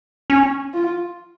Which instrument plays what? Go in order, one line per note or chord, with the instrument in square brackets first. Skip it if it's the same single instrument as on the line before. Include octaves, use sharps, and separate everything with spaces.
[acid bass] C#4
[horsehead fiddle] F4